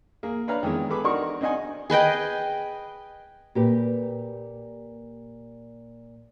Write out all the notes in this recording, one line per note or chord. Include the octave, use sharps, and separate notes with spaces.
A#3 G#4
D4 B4 C#5 F5 A#5
D#3 E3 G#3 B3
G#4 A4 B4 B5 D6
D4 D#4 F#4 A#4 C#6
C4 D4 D#4 D#5 F#5 G#5
G#4 B4 D#5 G5
A#2 G4 B4